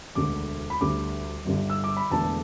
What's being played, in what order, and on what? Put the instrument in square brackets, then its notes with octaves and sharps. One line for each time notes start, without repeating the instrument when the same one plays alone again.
[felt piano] E1 D2 D3 D6
B5
D2 D3 G3 D6
G1 G2 D3 G3
E6
D6
B5
E1 E2 D3 A3 A5